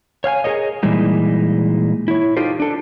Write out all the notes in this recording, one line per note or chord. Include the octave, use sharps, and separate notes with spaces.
C#5 F5 G5 G#5
G#4 A#4 C#5 D#5
A#2 E3 G3 G#3 D#4
E4 C#5
D#4 F4 G4 A4 C5
D4 A4